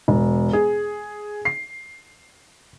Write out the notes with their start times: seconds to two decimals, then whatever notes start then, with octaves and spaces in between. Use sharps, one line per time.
0.08 E1
0.53 G#4
1.45 C7